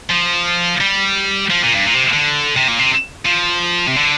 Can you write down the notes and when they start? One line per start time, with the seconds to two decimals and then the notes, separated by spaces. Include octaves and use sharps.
0.10 F3
0.81 G3
1.50 F3
1.63 A#2
1.74 G2
1.85 A#2
1.94 C3
2.13 D3
2.56 C3
2.68 A#2
2.79 C3
3.26 F3
3.87 C3
3.96 D3